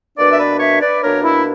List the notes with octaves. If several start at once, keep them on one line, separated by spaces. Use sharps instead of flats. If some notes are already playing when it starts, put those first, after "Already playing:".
B2 A#3 D4 B4 D5
E5
B4 D5
C#5 E5
B4 D5
B2 A#3 D4 A#4 C#5
E4